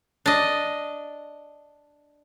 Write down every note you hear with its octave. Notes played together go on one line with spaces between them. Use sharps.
D4 D#5